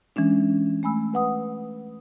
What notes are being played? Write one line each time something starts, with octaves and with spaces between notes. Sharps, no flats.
E3 G#3 C#4 D4
A3 G#5 B5 E6
B4 F#5 D#6